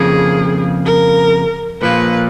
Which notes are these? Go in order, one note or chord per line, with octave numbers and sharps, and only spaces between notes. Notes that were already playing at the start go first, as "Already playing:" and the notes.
Already playing: F2 C#3 F3 A#3 G#4
A#4
A#2 F3 A#3 B4